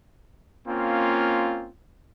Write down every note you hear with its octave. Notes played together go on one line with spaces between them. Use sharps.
A#3 C4 C#4 F4